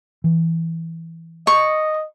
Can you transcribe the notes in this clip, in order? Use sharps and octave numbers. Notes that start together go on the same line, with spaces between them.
E3
D#5 C#6